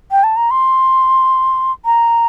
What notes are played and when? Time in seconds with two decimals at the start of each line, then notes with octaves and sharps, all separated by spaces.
0.11 G5
0.24 A5
0.36 A#5
0.51 C6
1.85 A#5